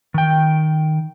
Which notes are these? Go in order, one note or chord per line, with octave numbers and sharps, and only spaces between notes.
D#3 G5